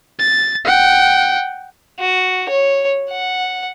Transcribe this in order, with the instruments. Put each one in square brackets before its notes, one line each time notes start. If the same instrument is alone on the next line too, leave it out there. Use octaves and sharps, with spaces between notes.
[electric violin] A6
F#5 G5
[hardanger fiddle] F#4
C#5
F#5